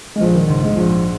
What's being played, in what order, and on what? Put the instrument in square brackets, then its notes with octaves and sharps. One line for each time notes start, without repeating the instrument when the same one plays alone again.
[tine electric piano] G#3
[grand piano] A#1 [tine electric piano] F3
[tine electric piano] D#3
[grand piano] G#2 [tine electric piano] C#3
[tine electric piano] G#3
[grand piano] A#1 [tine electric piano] F3